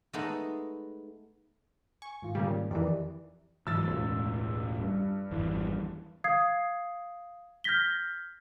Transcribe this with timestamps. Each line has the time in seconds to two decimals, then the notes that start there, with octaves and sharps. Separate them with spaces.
0.13 G#3 A3 B3 D#4 A4
2.02 G#5 C#6
2.22 G#2 D#3 F4
2.35 A#2 C#3 G3
2.71 F2 D#3 E3 G4 A#4 D5
3.67 G#2 E3 F#3 E6 A6
3.88 E1 C#2 A2
4.81 G2
5.31 G#1 F2 E3
6.24 F5 D#6 G#6 C7
7.64 F6 G6 G#6 A#6 B6 G7